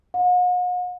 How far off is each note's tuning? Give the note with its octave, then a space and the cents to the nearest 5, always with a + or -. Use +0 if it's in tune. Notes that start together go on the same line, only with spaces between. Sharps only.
F#5 -45